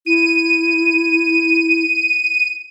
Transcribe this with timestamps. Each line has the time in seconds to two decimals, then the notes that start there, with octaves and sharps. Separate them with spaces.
0.06 E4 D#7